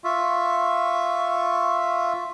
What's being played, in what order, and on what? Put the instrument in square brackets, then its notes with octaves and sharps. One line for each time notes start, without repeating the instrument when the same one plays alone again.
[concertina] F4 E5 [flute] C#6